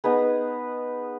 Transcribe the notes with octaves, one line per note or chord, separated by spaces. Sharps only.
B3 D#4 G#4 B4